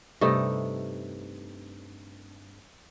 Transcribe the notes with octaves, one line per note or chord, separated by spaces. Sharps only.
G2 C3 A3 D#4